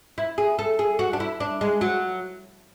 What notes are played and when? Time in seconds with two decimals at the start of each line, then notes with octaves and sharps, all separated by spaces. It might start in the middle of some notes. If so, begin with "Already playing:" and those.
0.18 E4
0.38 G#4
0.59 A4
0.79 G#4
0.99 F#4
1.13 D4
1.20 E4
1.40 D4
1.61 G#3
1.81 F#3